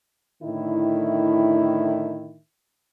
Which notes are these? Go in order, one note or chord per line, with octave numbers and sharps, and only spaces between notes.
A2 D3 D#3 E4